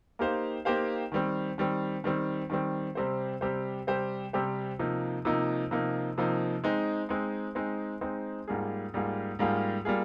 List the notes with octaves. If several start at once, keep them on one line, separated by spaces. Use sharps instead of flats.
A#3 D#4 G4 C5 F5
A#3 D#4 G4 C5 F5
D#3 G3 C4
D#3 G3 C4
D#3 G3 C4
D#3 G3 C4
C3 G3 C4 G4 C5
C3 G3 C4 G4 C5
C3 G3 C4 G4 C5
C3 G3 C4 G4 C5
C3 F3 A#3 D#4
C3 F3 A#3 D#4
C3 F3 A#3 D#4
C3 F3 A#3 D#4
G#3 C4 D#4
G#3 C4 D#4
G#3 C4 D#4
G#3 C4 D#4
G#2 G3 A#3 F4 G#4
G#2 G3 A#3 F4 G#4
G#2 G3 A#3 F4 G#4
G3 A#3 F4 G#4